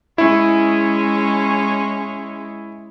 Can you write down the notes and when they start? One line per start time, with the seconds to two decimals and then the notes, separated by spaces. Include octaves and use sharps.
0.18 G#3 C#4 E4